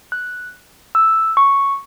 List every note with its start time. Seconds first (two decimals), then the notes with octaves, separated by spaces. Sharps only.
0.12 F#6
0.95 E6
1.37 C#6